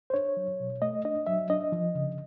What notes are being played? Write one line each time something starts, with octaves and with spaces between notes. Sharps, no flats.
C5
D4 C#5
F#3
B2
A3 D#5
D4 D#5
F#3 E5
D4 D#5
F3
C#3